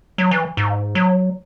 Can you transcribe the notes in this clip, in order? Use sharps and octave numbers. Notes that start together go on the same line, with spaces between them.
F#3
E3
G#2
F#3